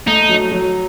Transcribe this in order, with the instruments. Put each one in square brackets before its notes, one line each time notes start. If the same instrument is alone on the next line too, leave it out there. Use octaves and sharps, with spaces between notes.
[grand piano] A3 [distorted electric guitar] D#4
[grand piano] F#3
F#3